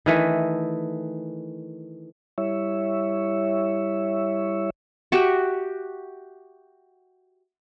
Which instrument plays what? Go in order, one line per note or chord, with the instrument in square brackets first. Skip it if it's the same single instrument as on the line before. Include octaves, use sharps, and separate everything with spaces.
[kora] D#3 E3 A3
[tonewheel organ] G3 E4 C#5 E5
[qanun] F#4 G4 E5